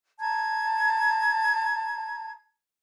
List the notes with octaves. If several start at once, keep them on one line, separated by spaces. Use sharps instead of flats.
A5 A#5 G#6